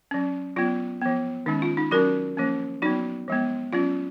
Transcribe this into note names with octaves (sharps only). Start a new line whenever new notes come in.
F#3 C#4
F#3 B3 F4
F3 B3
D#3 G#3 C#4 D#4
F4
D#4
F#3 C#4 F#4 A#4
F3 A#3 C#4
F#3 B3 D#4 F#4
F3 G#3 B3
F#3 C#4 F4